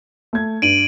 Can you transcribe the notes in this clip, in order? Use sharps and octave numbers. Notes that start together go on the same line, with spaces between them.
A3 G#6
G2 D7 D#7 F#7